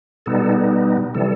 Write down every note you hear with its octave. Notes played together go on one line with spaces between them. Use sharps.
B2 G3 B3 D#4 A4
C3 E3 G3 A4